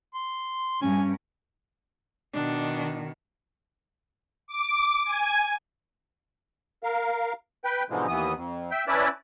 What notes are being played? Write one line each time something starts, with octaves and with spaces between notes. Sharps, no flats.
C6
G2 C#4 G#5
B2 D#3 D4
D6
G#5
A#4 F5
B4 G5
G#2 B2 D3 E3 F3 G#3
D#2 E3 B3 D#6
F2
E5 G5
C#4 E4 B4 D5 A5